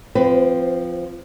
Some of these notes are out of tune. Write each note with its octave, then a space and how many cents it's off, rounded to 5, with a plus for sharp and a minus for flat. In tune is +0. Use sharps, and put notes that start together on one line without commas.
F3 +0 C4 -10 B4 +20